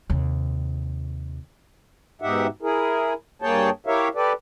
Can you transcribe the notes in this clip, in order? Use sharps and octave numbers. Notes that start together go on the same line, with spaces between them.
D#2 C3
G#2 B2 D#4 G4 E5 F#5
E4 G#4 A#4
G2 A#3 G#4 C#5 G5 A5
E4 G4 A#4 C#5 E5 F5
G4 A4 B4 D5